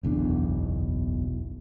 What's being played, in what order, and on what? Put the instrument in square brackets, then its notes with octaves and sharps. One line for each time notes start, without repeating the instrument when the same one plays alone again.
[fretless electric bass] F#1 B1 E2 D4